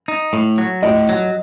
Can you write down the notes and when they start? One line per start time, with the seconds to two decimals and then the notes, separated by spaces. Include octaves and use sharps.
0.08 D#4
0.33 A2
0.58 F#3
0.83 A2 D#5
1.09 F#3